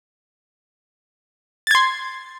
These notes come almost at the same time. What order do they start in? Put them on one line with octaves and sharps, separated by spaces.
A6 G#6 C6